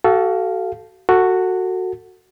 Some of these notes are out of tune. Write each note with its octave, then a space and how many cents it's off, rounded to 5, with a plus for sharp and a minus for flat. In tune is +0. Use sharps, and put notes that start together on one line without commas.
F#4 +30 A4 -5 F5 -5
F#4 +0 A4 +30